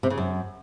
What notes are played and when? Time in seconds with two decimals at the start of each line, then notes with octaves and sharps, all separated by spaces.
0.03 C3
0.10 C#3
0.18 F#2